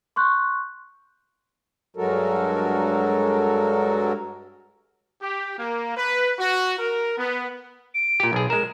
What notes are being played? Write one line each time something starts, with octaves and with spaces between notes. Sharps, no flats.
C6 C#6 F#6 G6
G2 F#3 G#3 F#4 A4 A#4
G4
A#3
B4
F#4
A#4
B3
D7
A#2 G4
B1 G#4
G#3 A#4 E7